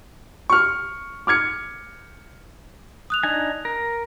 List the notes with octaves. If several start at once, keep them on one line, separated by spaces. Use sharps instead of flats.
C#6 F6
D6 F6 G#6 C#7
D#6 F#6 F7
D4 D#4 G#5
A#4